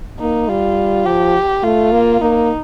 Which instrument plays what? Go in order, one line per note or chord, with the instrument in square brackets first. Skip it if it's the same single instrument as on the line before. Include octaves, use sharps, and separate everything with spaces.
[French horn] A#3 [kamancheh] D#4
[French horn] G3 [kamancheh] F4
[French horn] F3 [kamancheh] G4
[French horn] A3 [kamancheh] F4
[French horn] A#3
[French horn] A#3 [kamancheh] D#4